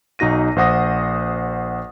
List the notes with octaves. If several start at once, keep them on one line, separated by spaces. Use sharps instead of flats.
B1 D#4 F#4 A#6 D#7
A#1 C5 F#5 D#6 A#6